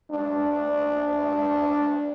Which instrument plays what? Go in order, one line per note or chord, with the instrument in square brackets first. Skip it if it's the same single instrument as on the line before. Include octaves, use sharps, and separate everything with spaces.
[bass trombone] D4